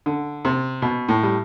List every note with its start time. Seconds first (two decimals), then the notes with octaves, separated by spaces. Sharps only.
0.06 D3
0.45 C3
0.82 B2
1.09 A2
1.23 G3